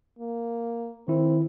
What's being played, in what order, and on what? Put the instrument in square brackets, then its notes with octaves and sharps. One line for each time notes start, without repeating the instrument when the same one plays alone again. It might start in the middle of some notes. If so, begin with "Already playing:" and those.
[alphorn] A#3
[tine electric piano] D#3 E4 [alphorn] C4